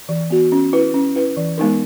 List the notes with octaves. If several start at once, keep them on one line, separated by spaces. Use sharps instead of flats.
E3
B3 F#4
C#4
E4 B4
C#4
E4 B4
E3
G#3 B3 D#4 A#4